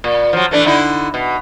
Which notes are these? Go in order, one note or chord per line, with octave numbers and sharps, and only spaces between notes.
A#2
F3 F#3
E3 A3 D4
D3 D#4 E4
B2